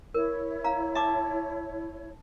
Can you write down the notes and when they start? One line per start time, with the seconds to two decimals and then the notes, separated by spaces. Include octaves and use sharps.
0.14 E4 A#4 C#5
0.64 F5 A#5
0.95 E5 A5 D6